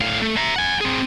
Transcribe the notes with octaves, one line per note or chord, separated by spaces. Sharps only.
A2 F5
A3
E5 A#5
F#5 G#5
C4 G#4